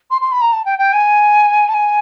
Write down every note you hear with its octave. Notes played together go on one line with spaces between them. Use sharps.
C6
C6
B5
A#5
A5
G5
G5
G#5
A5
G#5